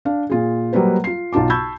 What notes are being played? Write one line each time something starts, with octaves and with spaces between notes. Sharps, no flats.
D4 F5
A#2 F4 G#4
F#3 G3 A#3 B4 C5
F4 C7
B1 D#4 F4 A5 D6
A5 B5 C#6 E6 G6 G#6